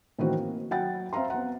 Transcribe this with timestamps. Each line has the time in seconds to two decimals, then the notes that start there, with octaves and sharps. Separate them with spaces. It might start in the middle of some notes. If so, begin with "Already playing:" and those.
0.18 A2 D#3 E3 A#3 C4 F#4
0.35 A#3
0.71 F#3 F#5 G5 A6
1.13 C4 E5 F5 A#5 C6
1.30 B3 F#5